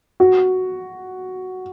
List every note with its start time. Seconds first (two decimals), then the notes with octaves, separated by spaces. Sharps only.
0.20 F#4